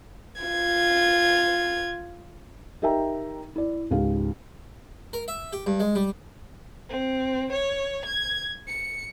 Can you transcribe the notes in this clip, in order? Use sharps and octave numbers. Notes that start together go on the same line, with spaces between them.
F4 G#6
D#4 G4 A#4 E5 G5 A#5
E4 D5
C#2 G#2 G4 F5
A#4
E5
G4
G2
G#3
G3
C4
C#5
G#6
C#7